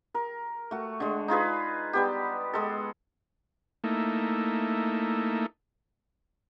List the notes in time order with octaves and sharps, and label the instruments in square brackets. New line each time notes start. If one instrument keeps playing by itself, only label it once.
[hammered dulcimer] A#4
A3 F#4
D3 G#3
D#4 F4 G#4 B4
G3 B3 G4
G#3 A4
[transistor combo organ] A3 A#3 D#4 E4